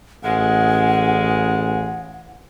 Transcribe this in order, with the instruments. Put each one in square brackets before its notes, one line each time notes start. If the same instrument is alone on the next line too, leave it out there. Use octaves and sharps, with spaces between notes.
[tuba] A1 [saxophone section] C#3 G#3 [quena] F#5